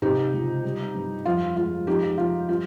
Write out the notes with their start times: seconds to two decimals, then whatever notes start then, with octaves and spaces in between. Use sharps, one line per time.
0.02 C3 D#4 G4
0.33 C#2
0.64 G3
0.95 G2
1.26 F2 F4
1.56 G#3 F4
1.87 F3 D#4 G4
2.18 F3 F4
2.49 G3 F4